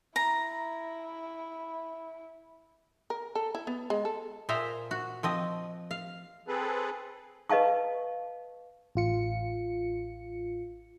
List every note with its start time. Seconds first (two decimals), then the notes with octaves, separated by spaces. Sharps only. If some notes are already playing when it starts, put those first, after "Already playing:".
0.16 E4 A#5
3.10 A#4
3.35 A4
3.55 E4
3.67 B3
3.90 G#3
4.05 A4
4.49 A#2 G#4 C5 E5 A#5
4.91 F#4
5.23 F3 C4 D#5
5.91 F5
6.48 C4 G#4 A4 B4
7.50 B4 D#5 F5 A5 C#6
8.95 A1 F4 C#7